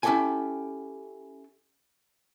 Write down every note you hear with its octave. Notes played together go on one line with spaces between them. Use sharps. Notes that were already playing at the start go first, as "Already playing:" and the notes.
C#4 E4 G4 A4 G5 G#5